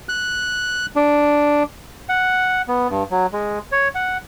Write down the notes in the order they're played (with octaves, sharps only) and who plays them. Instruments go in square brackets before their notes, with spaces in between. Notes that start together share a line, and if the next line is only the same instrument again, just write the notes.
[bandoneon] F#6
D4
F#5
B3
G2
F#3
G#3
C#5
F#5